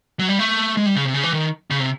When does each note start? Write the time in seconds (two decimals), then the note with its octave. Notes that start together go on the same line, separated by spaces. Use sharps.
0.19 F#3
0.29 G3
0.39 A3
0.77 G#3
0.86 G3
0.96 C#3
1.05 C3
1.14 C#3
1.23 E3
1.33 D#3
1.71 C#3
1.80 C3